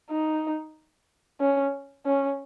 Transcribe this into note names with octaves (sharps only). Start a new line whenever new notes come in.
D#4
C#4
C#4